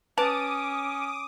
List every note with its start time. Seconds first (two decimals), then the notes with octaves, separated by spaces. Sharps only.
0.18 C#4 B4 A5 D6 D#6